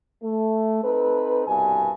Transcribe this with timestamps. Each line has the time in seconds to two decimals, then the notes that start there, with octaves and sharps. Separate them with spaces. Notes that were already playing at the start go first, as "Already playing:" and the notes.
0.23 A3
0.83 C4 D#4 A4 B4
1.47 C2 G2 B2 G#5